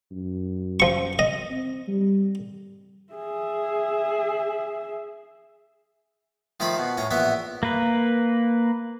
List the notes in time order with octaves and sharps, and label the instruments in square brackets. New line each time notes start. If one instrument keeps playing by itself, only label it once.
[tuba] F#2
[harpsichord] F3 C#6
D#5
[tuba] C4
G3
[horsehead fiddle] G#4 E5
[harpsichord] D#3 F3 A3 F5 A#5 B5
B2
A2 C#4 A#5
A#1 E3 B3 E4 E5
[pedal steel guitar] A#3 B4